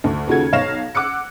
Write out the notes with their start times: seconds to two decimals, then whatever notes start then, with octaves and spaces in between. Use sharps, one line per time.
0.04 D2
0.27 D#2 C#3 F4 F#4 A4 G#6
0.52 B1 C#5 F5 A#6 E7
0.95 F#5 D6 E6 F#6 C#7